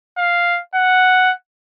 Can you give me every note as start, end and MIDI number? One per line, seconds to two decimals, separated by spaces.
0.18 0.59 77
0.75 1.33 78